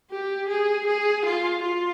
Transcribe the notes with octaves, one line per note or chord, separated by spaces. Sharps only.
G4
G#4
G#4
F4
F4